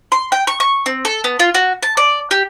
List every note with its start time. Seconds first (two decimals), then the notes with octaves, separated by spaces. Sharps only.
0.12 C6
0.32 G5
0.47 C#6
0.60 C#6
0.86 C4
1.05 A4
1.24 B3
1.39 F4
1.54 F#4
1.83 A5
1.97 D5
2.31 G4